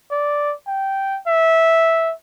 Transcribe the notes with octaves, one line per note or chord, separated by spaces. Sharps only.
D5
G5
E5